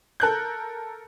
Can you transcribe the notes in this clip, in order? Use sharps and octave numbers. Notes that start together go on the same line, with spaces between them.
A4 A#4 F#6 G6